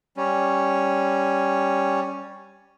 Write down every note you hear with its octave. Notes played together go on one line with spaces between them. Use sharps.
G3 C#4